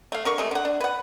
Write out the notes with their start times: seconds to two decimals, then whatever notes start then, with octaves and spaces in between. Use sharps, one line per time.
0.12 A3 F5
0.25 D3 A#4 C#6
0.38 C3 G#3 A3
0.51 D3 F#5
0.65 D4
0.80 B4 F#5